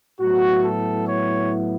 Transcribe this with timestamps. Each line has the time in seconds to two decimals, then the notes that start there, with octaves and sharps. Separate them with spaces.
0.20 A2 F#3 B3 E4 F#4
0.64 A4
1.08 C#5